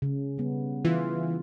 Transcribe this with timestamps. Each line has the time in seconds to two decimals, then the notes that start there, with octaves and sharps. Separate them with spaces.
0.02 C#3
0.38 G3 B3
0.85 E3 F4